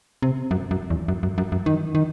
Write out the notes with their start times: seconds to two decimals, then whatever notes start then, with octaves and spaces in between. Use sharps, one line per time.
0.22 C3
0.51 F#2
0.71 F#2
0.90 E2
1.08 F#2
1.23 F#2
1.38 F#2
1.52 F#2
1.66 D#3
1.95 D#3